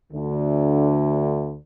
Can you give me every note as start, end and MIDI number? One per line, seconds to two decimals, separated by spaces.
0.13 1.55 38
0.13 1.55 50